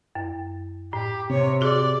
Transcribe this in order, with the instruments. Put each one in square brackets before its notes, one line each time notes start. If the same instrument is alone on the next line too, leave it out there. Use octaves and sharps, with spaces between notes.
[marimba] F#2
[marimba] A2 [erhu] G4
[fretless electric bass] C3 [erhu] C#5
[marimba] F#4 G#4 [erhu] D5